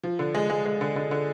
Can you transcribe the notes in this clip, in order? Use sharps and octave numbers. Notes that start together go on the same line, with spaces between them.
F3
D3
G#3
G#3
G#3
D3
D3
D3